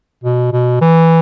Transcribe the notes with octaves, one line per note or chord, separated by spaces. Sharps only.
B2
B2
E3